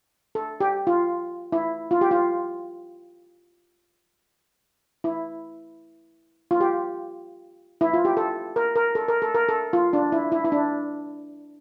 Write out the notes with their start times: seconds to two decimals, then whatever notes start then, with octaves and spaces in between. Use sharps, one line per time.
0.35 A4
0.60 G4
0.87 F4
1.52 E4
1.91 F4
2.01 G4
2.11 F4
5.04 E4
6.51 F4
6.61 G4
7.81 E4
7.93 F4
8.05 G4
8.17 A4
8.56 A#4
8.76 A#4
8.95 A4
9.08 A#4
9.22 A4
9.35 A#4
9.49 A4
9.73 F4
9.93 D4
10.12 E4
10.32 E4
10.45 E4
10.52 D4